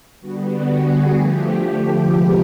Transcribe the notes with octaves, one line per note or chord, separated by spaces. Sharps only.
D3 G3 B3 F#4
F#4
G#4
D3 F3 A3 G4
G4
C3 F3 G#3 B3